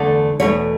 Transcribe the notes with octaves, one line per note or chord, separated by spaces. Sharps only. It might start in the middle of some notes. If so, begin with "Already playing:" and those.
Already playing: E2 D3 A3
E2 B2 A3 C#5